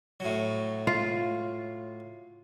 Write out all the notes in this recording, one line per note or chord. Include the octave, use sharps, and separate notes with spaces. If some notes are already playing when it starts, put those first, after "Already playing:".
A2 F#3
F4